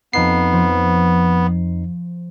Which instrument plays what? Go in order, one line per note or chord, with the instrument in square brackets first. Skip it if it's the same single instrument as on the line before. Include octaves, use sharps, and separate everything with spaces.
[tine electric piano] F2 D#4 C7 [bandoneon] B3
[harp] F3